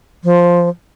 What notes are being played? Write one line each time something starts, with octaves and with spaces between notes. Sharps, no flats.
F3